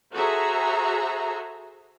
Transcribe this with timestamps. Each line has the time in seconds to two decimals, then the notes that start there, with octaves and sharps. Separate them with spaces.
0.13 F#4 G#4 A4 C5 E5 A#5